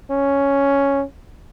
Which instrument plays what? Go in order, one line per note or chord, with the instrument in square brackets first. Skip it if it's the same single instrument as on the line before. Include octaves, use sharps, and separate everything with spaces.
[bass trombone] C#4